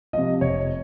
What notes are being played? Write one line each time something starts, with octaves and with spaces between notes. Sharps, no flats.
C3 F3 D#5
F1 C#5